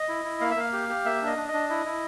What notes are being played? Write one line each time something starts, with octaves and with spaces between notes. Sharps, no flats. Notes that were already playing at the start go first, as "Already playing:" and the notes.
Already playing: D#5
E4
E4
A#3 F5
E5
A#3 F5
G4
G4
A#3 E5
D4
D#5
D4
D#5
D4
E4 D#5
E4